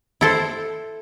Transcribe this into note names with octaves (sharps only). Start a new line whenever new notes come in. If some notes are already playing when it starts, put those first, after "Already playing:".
E4 A4 C5